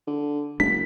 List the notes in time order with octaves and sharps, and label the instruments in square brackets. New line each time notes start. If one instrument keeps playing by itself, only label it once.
[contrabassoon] D3
[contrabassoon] F#1 [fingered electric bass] G#3 D4 [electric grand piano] B6